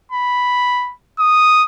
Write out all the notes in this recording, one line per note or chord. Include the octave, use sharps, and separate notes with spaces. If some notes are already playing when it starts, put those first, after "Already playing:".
B5
D#6